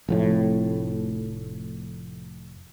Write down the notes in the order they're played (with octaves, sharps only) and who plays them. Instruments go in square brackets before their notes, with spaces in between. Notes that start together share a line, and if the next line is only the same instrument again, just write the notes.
[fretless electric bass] F1 F2 A2